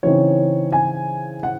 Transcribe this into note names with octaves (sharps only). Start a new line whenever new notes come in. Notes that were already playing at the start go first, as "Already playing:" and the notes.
C#3 E3 C4 D#4 C#5
G#5
F#5